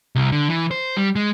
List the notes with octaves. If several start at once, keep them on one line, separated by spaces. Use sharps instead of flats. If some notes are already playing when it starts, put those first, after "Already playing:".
C2
D3
E3
C5
G3
G#3